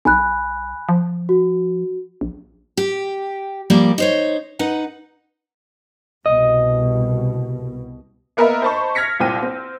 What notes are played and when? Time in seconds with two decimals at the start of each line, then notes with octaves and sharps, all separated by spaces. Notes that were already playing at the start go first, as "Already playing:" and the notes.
0.05 B1 G#5 B5 F#6
0.89 F3
1.29 F#4
2.21 A#1
2.77 G4
3.70 F3 G3 A#3 G4 D5
3.98 D#4 C5 C#5
4.59 D#4 B4 F#5
6.26 C2 B2 D#5
8.37 A#3 B3 A#4 D#5 E5
8.62 C5 D#5 A5 B5 C#6
8.95 F6 G#6 A#6 B6 C#7
9.20 C2 A#2 C4 G5 D#7
9.43 C4